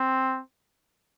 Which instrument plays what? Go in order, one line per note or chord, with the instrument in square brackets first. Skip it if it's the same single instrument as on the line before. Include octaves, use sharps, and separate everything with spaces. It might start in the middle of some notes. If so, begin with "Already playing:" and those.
Already playing: [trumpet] C4